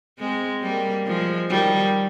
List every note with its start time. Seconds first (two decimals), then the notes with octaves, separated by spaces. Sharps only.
0.19 G#3 C4
0.62 G3 A#3
1.06 F3 G#3
1.50 D#3 G3